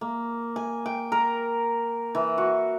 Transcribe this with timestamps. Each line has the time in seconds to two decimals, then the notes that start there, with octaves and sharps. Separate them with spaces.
0.01 A#3
0.56 G#5
0.86 G5
1.12 A#4
2.15 E3
2.38 F#4